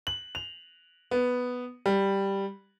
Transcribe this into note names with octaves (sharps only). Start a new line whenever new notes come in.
F#7
F7
B3
G3